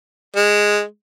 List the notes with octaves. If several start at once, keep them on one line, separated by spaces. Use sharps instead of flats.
G#3